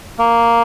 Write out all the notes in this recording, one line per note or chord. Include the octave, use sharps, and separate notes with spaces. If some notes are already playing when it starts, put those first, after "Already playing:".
A#3